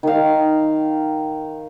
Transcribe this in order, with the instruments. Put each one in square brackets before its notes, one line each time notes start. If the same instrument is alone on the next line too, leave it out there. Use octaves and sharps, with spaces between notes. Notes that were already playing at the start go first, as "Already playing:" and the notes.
[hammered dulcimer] D#3 F5